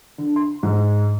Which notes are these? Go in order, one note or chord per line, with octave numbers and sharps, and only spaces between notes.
D3
C6
G#2